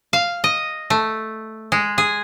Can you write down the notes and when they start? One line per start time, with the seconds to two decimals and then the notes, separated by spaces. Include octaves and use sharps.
0.13 F5
0.44 D#5
0.90 A3
1.72 G#3
1.98 G#4